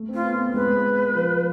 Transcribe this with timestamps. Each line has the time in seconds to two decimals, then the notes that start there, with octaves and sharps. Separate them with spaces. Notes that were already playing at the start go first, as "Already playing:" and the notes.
Already playing: A3
0.09 C4
0.14 F4
0.24 B3
0.39 B3
0.54 G#3 B4
1.15 F3